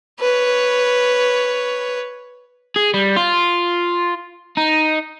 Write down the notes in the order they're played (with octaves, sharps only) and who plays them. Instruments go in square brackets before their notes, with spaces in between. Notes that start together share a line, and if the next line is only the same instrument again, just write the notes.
[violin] B4 C#5
[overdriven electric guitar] G#4
G3
F4
D#4